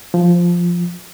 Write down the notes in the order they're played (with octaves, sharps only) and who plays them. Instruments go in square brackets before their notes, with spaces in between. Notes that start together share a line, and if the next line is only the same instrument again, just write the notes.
[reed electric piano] F3